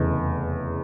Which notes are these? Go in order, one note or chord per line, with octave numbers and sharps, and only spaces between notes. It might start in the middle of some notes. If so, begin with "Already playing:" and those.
Already playing: F1 E2 C#3